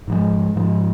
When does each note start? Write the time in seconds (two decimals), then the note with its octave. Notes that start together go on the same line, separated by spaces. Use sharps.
0.07 G#2 F3 G#3
0.56 G#2 F3 G#3